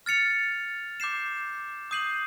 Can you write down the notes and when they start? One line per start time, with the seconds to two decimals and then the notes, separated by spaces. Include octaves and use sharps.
0.06 F6 A6 C#7 F7
1.00 D6 G6 C7 E7
1.91 D#6 G6 C7 D#7 F#7